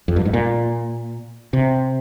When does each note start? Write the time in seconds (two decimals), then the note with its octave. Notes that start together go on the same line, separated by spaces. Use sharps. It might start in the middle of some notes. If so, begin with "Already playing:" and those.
0.08 F2
0.16 G2
0.25 G#2
0.34 A#2
1.53 C3